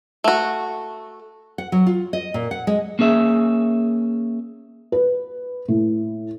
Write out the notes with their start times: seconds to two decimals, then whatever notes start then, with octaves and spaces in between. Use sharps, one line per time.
0.24 A3 F#4
1.58 F#5
1.72 F#3
1.87 F4
2.13 D#5
2.34 A#2
2.51 F#5
2.67 G#3
2.99 A#3 C#4 G#4 E5
4.92 B4
5.68 A2